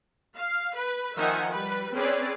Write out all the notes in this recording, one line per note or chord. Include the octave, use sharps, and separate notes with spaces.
F5
B4
D#3 F3 D#4 E5 F#5 G#5
G3 B4
C4 C#4 G#4 B4 C#5 D5